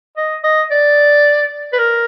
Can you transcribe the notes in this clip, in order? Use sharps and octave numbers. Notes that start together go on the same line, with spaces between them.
D#5
D#5
D5
B4
A#4